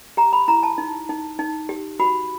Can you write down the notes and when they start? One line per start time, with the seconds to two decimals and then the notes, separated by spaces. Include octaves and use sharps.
0.17 G4 A#5
0.33 B5
0.48 E4 A#5
0.63 A5
0.78 D#4
1.09 D#4
1.39 D#4
1.69 G4
1.99 F#4 B5